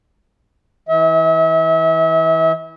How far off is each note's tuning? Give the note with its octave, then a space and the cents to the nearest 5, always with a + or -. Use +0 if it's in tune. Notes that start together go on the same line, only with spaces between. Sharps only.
E3 -20 E5 -40